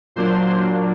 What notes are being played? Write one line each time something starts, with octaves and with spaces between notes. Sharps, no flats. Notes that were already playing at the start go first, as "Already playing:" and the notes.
A#2 F#3 A#3 D4 C5 C6